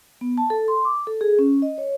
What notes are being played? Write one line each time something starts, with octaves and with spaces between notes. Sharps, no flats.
B3
A5
A4
C6
D6
A4
G#4
C#4
D#5
C#5